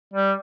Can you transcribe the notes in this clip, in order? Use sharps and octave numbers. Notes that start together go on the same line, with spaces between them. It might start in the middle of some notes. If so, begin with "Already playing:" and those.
G3